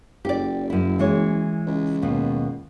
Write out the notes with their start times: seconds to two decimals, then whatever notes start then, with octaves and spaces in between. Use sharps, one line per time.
0.25 F#1 G4 D5
0.70 F#2 E4
0.99 E3 G#3 C#5
1.67 C#2
2.02 D#2 B2